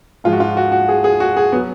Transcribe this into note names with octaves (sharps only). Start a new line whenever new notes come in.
G#2 F3 G#3 F4
F#4
F4
F#4
F#4
G#4
G#4
F#4
G#4
F#3 B3